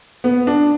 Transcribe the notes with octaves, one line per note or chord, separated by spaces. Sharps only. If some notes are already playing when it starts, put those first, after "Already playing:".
B3
D4